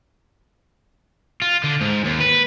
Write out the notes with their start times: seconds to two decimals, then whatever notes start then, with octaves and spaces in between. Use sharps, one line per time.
1.42 F4
1.64 D3
1.81 G#2
2.04 D#2
2.20 B4